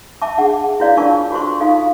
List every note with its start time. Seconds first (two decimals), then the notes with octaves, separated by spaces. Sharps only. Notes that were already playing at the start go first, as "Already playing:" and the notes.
0.22 E5 A5 D6
0.38 D4 G#4 F#5
0.80 E4 F#4 B4 C#5 D5 F5
0.97 D4 F4 A#4 A5 C#6 D6
1.31 F4 F#4 A4 C5 C6 C#6
1.60 D#4 F4 A4 F5